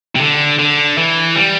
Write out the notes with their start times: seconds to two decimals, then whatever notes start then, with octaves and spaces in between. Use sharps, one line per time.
0.15 C3
0.20 D3
0.59 D3
0.98 E3
1.36 G3